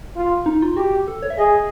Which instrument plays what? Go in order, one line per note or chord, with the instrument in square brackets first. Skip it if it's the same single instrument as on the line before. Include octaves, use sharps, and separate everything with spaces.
[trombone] F4
[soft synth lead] D#4
F4
[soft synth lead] F#4 [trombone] G4
[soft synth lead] A4
C#5
E5
[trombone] G#4 [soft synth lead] D#5